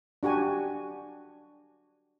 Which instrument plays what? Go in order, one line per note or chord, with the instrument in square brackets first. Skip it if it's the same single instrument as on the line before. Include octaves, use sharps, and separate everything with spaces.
[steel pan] D4 F#4 G4 G#5